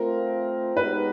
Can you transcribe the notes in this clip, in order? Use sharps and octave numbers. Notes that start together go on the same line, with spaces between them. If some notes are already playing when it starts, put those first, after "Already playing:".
Already playing: A3 C4 F4 A#4
G#3 B3 D#4 G4 B4